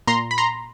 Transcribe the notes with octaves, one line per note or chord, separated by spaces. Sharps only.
A#2 A#5 C6
B5
A#5 C6